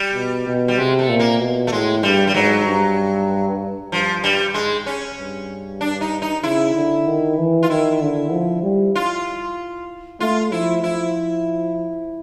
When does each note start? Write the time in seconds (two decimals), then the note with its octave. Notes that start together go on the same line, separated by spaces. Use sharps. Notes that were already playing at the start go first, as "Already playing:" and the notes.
Already playing: G3
0.14 B2
0.47 B2
0.68 G3
0.78 C3 G#3
0.99 A3
1.09 A#2
1.20 A#3
1.40 B2
1.67 A3
1.72 A2 G#3
2.03 G2 G3
2.27 G3
2.34 G#2 F#3
2.66 G2
3.91 G2 F3
4.24 G2 G3
4.54 G#2 G#3
4.86 C#4
5.17 G2
5.81 D4
6.01 D#4
6.22 D#4
6.43 C#3 E4
6.75 D3
7.07 D#3
7.37 E3
7.63 F4
7.70 D#3 E4
8.01 D3
8.32 F3
8.63 G3
8.95 F4
10.20 A3 F4
10.51 F3 E4
10.84 F3 E4